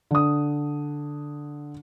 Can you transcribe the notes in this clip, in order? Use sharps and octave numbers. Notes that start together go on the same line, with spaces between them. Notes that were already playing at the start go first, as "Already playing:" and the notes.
D3 D#6